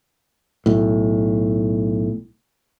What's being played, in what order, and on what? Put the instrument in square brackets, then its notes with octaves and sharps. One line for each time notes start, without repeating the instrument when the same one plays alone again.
[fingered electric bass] B1 A2